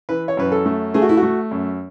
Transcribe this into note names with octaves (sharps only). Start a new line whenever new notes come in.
E3 B4
C#5
F#2 B4
A4
A3
A3 G#4
F#4
E4
F#4
A3
F#2